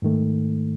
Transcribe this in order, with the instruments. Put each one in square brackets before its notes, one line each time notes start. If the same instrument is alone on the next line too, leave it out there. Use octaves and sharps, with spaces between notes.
[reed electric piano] G#2 D#3 A3